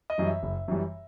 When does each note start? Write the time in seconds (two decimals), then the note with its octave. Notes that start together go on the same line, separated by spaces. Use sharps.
0.10 D#5
0.18 F#2 E3 G3
0.27 E5
0.43 F#1
0.68 F#2 E3 G3